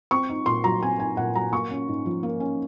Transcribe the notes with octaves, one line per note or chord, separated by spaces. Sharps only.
C4 C#6
D#4
A#2 C6
F#3 A#5
C4 G#5
D#4 G#5
A#2 F#5
F#3 A#5
A#3 C#6
C#4
G#2
F3
A#3
C#4